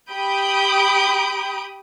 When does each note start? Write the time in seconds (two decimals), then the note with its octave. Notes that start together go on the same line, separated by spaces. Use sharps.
0.11 G4 B5 D#6 G6 D7